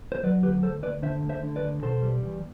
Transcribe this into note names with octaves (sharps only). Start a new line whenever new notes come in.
C5
F#3 B4 D5
D2 G4 B4
D2 A4 C5
D2 B4 D5
D3 C5 E5
D2
C5 E5
D3
B4 D5
D2
B2 A4 C5
G3
E2